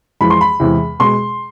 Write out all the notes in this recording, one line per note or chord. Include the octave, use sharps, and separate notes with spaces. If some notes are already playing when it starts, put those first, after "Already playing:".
F2 E3 G#3 B5
C6
B5
E2 C3 E3 G#3
B2 G#3 C6